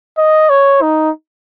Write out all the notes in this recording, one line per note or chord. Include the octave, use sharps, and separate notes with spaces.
D#5
C#5
D#4